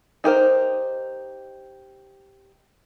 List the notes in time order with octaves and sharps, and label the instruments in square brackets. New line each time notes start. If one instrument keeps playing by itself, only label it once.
[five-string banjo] D#4 G4 A#4 C5